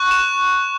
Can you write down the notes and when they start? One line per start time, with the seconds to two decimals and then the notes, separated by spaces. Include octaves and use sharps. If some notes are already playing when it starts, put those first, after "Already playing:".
Already playing: C#6 F#6
0.11 E7